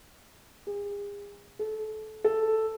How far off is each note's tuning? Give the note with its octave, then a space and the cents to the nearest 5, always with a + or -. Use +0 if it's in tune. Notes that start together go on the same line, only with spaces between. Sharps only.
G#4 -40
A4 -25
A4 +0